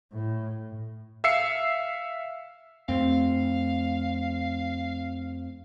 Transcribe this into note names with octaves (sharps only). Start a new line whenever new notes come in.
A2
E5 F5 E6 C7 C#7
F2 A3 C4 F5